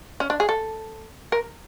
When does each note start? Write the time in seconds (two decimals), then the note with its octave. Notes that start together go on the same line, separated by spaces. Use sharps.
0.20 C#4
0.30 D4
0.40 G#4
0.49 A4
1.32 A#4